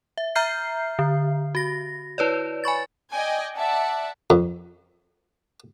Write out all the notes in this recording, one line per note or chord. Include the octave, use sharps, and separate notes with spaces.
E5
E5 A#5 F6 G6 C7
D3
F#4 A#6
E4 B4 C#5 D5
G#5 B5 C#6 A6
D5 D#5 G5 G#5
D5 E5 F#5 A5
F2